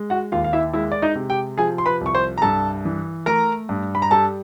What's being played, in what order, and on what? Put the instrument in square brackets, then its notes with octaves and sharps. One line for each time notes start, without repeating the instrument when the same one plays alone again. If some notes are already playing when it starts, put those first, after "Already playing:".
Already playing: [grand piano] G#3
F#4 F#5
D#2 F4 F5
F5
E4 E5
G#3 E4 E5
D5
D#4 D#5
C3
G4 G5
F3 G#4 G#5
C6
B4 B5
C2
C#6
C5 C6
A#5
G2 A4 A5
E3
A3 A#4 A#5
G2
B5
A#5
G3 A4 A5